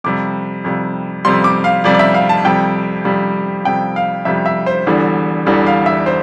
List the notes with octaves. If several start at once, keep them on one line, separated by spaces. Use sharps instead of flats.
F2 C3 G3 D6
F2 C3 G3
F2 C3 G3 C6
D6
F5
F2 C3 G3 D5
D5
E5
F5
A5
F2 C3 G3 G5
F2 C3 G3
F2 C3 G3 G5
F5
F2 C3 G3 E5
E5
C5
E1 E2 D3 G3
E1 E2 D3 G3
F5
E5
C5